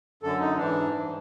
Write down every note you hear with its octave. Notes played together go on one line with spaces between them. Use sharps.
F#2 D3 A4
D#4
G#2 E3 D4
G2 E3